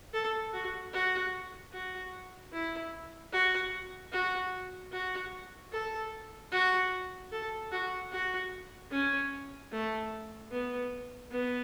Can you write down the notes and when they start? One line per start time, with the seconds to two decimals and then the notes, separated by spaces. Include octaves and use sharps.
0.14 A4
0.53 F#4
0.93 F#4
1.73 F#4
2.53 E4
3.33 F#4
4.13 F#4
4.92 F#4
5.72 A4
6.52 F#4
7.32 A4
7.72 F#4
8.12 F#4
8.91 C#4
9.72 A3
10.51 B3
11.31 B3